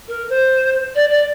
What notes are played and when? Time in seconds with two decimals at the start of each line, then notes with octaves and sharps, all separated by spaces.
0.08 A#4
0.29 C5
0.95 D5
1.10 D5